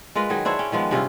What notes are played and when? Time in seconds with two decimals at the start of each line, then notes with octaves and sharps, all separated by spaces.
0.15 G#3 F4 A#4 B4
0.30 D#3 F#3 G#4
0.45 D4 E4 C5 C#5
0.59 C#4 G5
0.72 D#3 F3 G#3 B3
0.91 G2 C3 C#4 F4